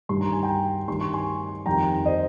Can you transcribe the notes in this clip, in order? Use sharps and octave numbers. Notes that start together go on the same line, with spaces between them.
G2 D#3 G3 C6
A#5
G#5
G5 A#5
G2 D#3 G3 C6
C#6
G#5 C6
F2 D#3 G3 G5 A#5
C5 D#5